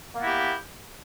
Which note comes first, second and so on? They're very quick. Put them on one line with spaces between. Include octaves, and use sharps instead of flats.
A#3 B3 F#4 E4 G4